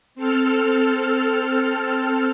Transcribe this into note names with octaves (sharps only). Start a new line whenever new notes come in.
C4 A4 F6